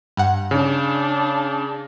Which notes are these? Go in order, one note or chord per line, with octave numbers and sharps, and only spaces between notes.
G2 F#5
C#3 D4